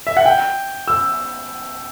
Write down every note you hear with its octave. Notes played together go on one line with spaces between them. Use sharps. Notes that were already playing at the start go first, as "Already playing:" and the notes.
E5
F#5
G5
E6